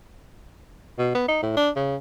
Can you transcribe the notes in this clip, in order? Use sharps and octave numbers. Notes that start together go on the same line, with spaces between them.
B2
B3
D#4
A2
D4
C#3